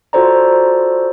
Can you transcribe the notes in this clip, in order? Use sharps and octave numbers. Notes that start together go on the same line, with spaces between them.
F4 F#4 A4 C5 D5 A#5